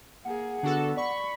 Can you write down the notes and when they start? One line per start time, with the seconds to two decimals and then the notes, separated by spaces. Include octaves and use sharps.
0.25 A#3 G#4 F#5
0.63 D3 B3 D4 F#4 A4
0.97 D5 B5 C#6